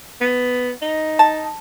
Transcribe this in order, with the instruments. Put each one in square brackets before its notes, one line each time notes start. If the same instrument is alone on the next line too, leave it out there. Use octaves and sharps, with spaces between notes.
[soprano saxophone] B3
D#4
[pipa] A5